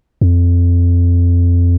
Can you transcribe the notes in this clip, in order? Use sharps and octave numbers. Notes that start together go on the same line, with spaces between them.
F2